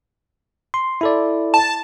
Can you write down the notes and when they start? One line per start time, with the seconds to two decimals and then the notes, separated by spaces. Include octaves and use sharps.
0.74 C6
1.01 E4 A4 D5
1.54 A5